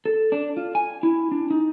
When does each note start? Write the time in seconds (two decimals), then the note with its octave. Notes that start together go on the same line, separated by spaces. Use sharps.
0.06 A4
0.32 D4
0.57 F4
0.75 G#5
1.03 E4
1.32 D4
1.51 D#4